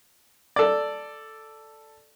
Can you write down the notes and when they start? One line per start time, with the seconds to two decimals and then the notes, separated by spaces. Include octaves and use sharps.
0.56 A4 D5